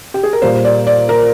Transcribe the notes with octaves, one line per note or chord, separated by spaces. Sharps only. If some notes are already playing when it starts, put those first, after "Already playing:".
G4
G#4
A#4
A#2 G3 A#3 C5
D5
D5
A#4